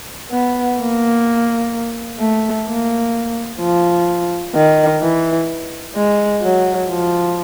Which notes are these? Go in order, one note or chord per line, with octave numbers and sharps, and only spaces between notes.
B3
A#3
A3
A#3
F3
D#3
E3
G#3
F#3
F3